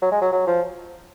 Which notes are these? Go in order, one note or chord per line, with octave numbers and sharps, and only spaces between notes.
F#3
G#3
F#3
F#3
F3